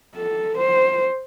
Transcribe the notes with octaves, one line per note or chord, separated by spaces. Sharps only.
A4
C5